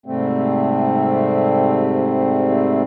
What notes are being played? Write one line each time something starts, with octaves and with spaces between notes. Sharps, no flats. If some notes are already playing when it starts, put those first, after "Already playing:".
G#2 C3 G3 A3 C4